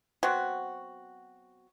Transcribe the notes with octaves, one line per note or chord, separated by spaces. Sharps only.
F#3 B3 C4 F#4